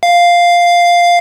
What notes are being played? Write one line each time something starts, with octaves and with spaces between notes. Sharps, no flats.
F5